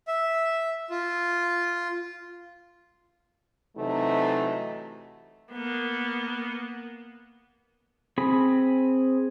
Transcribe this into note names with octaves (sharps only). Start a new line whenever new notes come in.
E5
F4
C3 E3 F#3 A3 D#4
A#3 B3
C4 G#4 B5